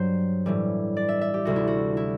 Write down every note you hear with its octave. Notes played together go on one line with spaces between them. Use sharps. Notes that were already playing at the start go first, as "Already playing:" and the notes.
Already playing: G2 F#3 C5
A2 E3 G3
D5
E5
E5
G4
D2 C3 G3 F#4
E4
F#4
E4